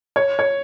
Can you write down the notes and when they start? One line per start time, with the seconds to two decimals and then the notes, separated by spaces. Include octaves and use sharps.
0.16 C#5
0.39 C#5